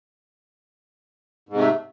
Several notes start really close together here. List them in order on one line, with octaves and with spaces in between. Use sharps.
G#2 C3 A3